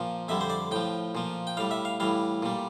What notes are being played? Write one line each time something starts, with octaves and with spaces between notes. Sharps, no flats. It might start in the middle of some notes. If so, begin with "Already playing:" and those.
Already playing: A#2 F3
F2 D3 G3 E5
C5
D5
A2 F3 G5
A#2 F3
G5
A2 G3 F5
E5
F5
A2 E3 G3 F5
A#2 G3